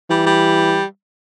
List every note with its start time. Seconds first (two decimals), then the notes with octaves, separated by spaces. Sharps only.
0.09 E3 G3
0.26 G3